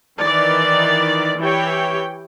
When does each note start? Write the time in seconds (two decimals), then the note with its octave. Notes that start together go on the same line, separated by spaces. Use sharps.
0.21 D#3 E3 D5
1.39 E3 G4 C#5 G5